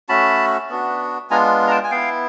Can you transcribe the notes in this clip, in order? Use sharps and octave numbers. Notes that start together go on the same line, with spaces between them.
A3 C#4 F#4 A5 B5
B3 D4 F#4
G#3 B3 D4 F4 G#5 A#5
A#5
G5 A5
G#5
B3 E4 F5 G5